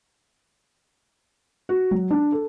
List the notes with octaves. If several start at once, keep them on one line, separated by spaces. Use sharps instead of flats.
F#4
F#3
D4
A4